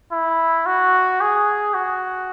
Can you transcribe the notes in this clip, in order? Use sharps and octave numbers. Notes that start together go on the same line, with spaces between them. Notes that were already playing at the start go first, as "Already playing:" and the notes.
E4
F#4
G#4
F#4